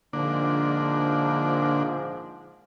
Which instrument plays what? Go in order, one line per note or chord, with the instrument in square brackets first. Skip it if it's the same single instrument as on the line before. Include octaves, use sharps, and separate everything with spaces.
[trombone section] A#1 G#2 F3 [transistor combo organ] D3 A#3 D4